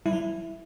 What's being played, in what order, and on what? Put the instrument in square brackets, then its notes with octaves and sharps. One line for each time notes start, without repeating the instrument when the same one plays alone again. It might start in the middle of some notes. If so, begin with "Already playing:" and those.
[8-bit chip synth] G3 [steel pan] E4
[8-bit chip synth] F#3